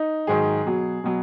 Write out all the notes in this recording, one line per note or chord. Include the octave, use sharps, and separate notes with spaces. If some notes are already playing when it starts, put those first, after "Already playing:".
Already playing: D#4
G#2 D#3 F#3 G#4
B2 F#3
B2 F#3